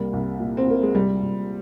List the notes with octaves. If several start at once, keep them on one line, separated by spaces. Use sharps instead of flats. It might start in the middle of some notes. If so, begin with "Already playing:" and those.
Already playing: C2 G3 A#3
C2
A#2
C4
A#2 A#3
G#3
C2 G3
C2